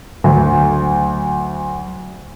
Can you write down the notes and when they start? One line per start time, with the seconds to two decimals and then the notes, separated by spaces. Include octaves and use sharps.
0.24 D2 F#3